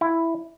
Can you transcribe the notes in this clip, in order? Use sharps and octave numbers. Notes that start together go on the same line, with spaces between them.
E4